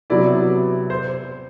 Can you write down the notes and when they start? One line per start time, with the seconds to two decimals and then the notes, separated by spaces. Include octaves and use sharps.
0.10 C3 F#3 B3 E4 D5
0.90 C5